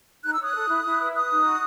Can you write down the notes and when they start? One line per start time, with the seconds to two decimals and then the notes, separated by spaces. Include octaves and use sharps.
0.24 D#4 F#6
0.34 E6
0.39 C#5 D#6 F#6
0.54 A4
0.69 E4
0.84 E4
1.00 B4
1.14 B4 D#6 F#6
1.30 D#4
1.45 F#4